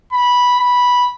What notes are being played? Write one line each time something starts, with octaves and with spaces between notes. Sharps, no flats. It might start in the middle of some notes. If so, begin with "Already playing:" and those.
B5
B5